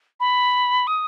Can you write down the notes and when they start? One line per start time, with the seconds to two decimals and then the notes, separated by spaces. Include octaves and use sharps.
0.20 B5
0.87 D#6